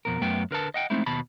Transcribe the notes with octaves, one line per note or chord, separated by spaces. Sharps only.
F2 B2 A#4
F#2 A3 B3 G5
D3 A#4 B4 A5
D#5 F#5 G5
G#3 A3 C4 D#4 E4
D#2 B2 A5 B5